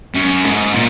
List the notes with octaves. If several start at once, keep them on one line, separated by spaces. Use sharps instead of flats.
F#2
G#2
A#2